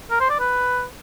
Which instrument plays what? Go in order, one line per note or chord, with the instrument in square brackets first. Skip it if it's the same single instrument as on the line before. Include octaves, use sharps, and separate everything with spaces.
[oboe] A#4
C5
D5
B4